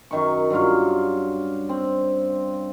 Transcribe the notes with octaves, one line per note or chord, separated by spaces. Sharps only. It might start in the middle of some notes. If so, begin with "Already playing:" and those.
F#2 D#3 C#6
G2 F#3 F4 F5
C4